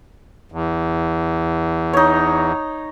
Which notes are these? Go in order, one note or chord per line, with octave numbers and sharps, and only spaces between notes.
E2
D#4 C#5